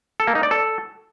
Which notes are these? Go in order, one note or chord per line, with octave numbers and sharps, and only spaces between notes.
A4
A#3
D#4
D5
A4